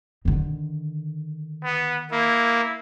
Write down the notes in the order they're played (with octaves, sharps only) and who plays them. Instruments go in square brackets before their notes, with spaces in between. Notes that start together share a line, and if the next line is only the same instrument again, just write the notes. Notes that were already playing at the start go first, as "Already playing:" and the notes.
[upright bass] D3 D#3
[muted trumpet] B3
[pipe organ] A#3 [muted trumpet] E4